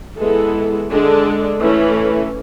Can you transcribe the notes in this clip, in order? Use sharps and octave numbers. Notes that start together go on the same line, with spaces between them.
E3 G#3 B3 E4 A4
D3 G#3 D4 A4
E3 A3 C#4 E4